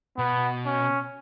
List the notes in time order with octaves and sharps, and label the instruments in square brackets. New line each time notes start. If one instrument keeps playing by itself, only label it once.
[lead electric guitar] B2 [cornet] B3
[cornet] C#4